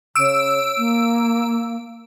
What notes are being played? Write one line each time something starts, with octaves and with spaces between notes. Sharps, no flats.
C#3 E6 D7
A#3